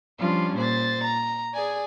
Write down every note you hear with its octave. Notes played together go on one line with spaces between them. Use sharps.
F3 G3 C#4 D4 F4
A#2 C5 A6
A#5
G#4 D5 G#5